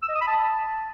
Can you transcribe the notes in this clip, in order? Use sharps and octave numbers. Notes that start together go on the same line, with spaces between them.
E6
D#5
D#6
B5
A5